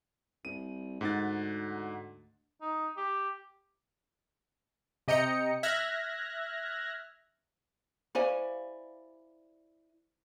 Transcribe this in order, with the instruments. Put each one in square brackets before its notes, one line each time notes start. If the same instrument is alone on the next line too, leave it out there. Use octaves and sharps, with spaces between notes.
[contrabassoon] C2 [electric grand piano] D#7
[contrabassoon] D2 [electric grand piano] G#2 F#5 A6
[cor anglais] D#4
G4
[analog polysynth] C3 D#5 G5 A#5 C#7
E5 F6 F#6 G#6 A#6
[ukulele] E4 D5 G#5 [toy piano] G4 C5 F5